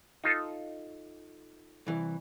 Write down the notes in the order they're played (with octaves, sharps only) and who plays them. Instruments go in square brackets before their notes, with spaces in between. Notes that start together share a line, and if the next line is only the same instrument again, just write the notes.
[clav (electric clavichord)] D#4 F4 A4
[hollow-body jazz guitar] C2 E3